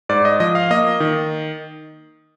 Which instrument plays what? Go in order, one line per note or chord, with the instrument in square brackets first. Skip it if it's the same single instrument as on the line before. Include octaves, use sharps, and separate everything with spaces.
[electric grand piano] G#2 D5
D#5
F3 D#5
F5
A#3 D#5
D#3